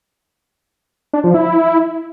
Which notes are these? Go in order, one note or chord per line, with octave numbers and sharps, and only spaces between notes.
D4
F3
E4